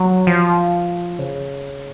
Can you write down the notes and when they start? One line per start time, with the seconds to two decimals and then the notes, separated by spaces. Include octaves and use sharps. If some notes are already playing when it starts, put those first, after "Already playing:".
Already playing: F#3
0.27 F3
1.19 C#3